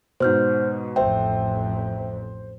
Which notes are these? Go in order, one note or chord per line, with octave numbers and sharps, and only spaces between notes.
G#2 B2 C5 F6 G6
A1 F2 C5 E5 G5